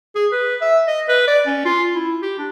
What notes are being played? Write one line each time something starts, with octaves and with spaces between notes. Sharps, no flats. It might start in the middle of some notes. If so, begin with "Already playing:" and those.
G#4
B4
E5
D#5
B4
D5
C#4
F4
E4
G4
D4